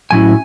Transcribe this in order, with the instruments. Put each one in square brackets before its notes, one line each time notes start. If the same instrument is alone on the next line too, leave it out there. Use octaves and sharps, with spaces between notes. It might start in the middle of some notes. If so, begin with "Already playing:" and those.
[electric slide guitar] A2 F#3 C#4 E4 G#5